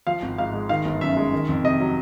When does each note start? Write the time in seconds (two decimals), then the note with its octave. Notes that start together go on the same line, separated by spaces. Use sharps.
0.07 F3 F5
0.22 G#1
0.38 G#2 F5
0.53 G#3
0.69 D#3 F5
0.85 G1
1.01 F#2 E5
1.17 G#3
1.33 D#3
1.49 F2
1.64 C3 D#5
1.80 F#3